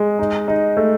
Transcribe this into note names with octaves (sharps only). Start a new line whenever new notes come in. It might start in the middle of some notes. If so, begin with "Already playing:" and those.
Already playing: G#3
D#4
D#4
A3